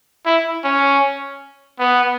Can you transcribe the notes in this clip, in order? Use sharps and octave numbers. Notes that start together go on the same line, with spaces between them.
E4
C#4
B3